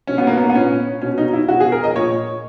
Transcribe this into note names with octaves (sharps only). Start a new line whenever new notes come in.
B2 C#4
B3
A#3
B3
B3
A#2 C#4
B2 C#4
D#4
E4
B2 F#4
G#4
A#4
D#5
A#2 C#5